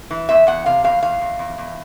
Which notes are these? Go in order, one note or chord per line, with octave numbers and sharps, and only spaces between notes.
E3
E2 E5
E2 F#5
C3 F5
E2 F5
E2 F5
E2
E2
E2